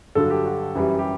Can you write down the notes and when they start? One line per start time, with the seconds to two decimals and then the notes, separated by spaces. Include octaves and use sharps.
0.15 G2 D3 F#3 A4
0.30 G4
0.45 F#4
0.75 F#2 E3 G3
0.99 G4